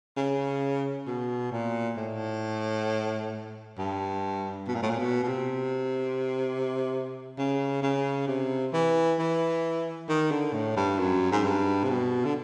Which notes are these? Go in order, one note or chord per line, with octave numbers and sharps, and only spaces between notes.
C#3
B2
A#2
A2
G2
B2
A#2
A2
A#2
B2
B2
C3
C#3
C#3
C3
E3
E3
D#3
D3
A2
G2
F#2
G#2
G2
C3
B2
D3